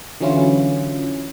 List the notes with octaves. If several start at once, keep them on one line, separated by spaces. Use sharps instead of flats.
D3 E3 F#3 C#4 E4 F4